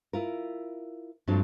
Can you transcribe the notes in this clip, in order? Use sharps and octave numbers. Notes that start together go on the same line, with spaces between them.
E4 F4 A#4
G2 F3 F#3 A3 C4 D4